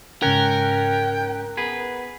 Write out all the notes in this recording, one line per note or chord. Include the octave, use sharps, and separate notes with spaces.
G#2 C#3 C#4 A#4 G5 F#6
B3 G#4 B4